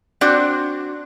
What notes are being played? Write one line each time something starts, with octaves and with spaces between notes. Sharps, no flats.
C4 D4 F#4 D5